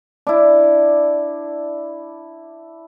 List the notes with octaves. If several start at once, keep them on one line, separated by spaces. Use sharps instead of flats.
D4 E4